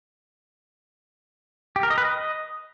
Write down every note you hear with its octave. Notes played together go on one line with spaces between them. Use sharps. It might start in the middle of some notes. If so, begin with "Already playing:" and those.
G4
A#4
D#5
B4
D#5